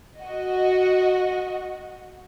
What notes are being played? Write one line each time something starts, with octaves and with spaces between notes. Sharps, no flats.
F#4 D#5